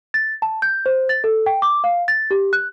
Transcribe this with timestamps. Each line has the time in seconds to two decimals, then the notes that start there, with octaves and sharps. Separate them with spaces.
0.14 A6
0.42 A5
0.62 G6
0.86 C5
1.09 A6
1.24 A4
1.46 G5
1.62 D6
1.84 F5
2.08 A6
2.31 G4
2.53 F#6